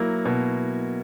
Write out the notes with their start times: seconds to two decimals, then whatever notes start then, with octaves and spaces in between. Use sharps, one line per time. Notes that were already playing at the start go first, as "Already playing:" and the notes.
Already playing: F#3 A#3 E4
0.25 B2